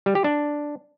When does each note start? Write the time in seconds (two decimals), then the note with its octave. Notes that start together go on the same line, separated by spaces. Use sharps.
0.06 G3
0.15 G4
0.24 D4